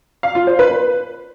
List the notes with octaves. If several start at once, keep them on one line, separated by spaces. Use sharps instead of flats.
F5
F4
C5
B4
B4